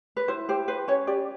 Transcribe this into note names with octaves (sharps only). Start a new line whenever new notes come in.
B4
E4 C5
G4 C5
B4 C5
C#4 C#5
G4 D5